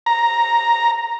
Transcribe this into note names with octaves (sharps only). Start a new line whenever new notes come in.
A#5